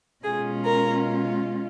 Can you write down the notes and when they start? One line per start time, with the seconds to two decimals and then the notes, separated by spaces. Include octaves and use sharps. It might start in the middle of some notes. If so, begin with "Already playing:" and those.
0.24 B2 G#3 C#4 F4 G#4
0.65 A#4